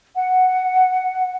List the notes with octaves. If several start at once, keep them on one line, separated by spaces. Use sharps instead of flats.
F#5